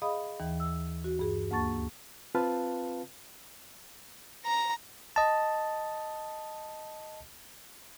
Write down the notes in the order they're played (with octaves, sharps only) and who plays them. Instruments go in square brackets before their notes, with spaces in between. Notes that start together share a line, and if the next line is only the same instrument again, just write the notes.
[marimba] G#4 D#5 F5 B5 D#6
D#2 E3
E6
F#4
G2 G#4
D2 A#3 A5 C#6 A6
[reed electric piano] C4 F4 B4 F5 A5
[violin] A#5
[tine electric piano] D#5 A5